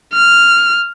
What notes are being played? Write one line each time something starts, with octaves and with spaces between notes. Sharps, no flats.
F6